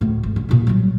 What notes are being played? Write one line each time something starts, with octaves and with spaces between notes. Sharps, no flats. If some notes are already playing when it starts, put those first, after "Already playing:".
D2 A2
G#1
D3
A#2 E4
F#3 G3